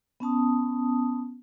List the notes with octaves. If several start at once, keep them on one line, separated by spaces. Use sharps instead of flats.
B3 C#4 A5 D#6